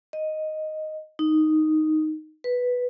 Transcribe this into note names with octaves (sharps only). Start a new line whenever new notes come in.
D#5
D#4
B4